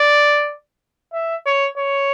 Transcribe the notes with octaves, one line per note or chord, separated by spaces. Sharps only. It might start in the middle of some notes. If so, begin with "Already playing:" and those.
Already playing: D5
E5
C#5
C#5